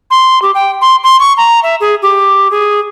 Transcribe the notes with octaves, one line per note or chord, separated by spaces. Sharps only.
C6
G4
G5
C6
C6
C#6
A#5
E5
G#4
G4
G#4